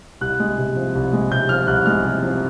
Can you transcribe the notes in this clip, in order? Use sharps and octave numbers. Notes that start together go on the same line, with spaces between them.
C2 F#6
G#3
C3
F3
C2
G#3
C3 G6
F3 F6
C2 F#6
G#3 F6
C3
F3